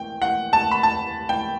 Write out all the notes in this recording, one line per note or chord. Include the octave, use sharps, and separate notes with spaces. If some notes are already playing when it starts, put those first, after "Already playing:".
Already playing: G5
F#5
A5
B5
A5
G5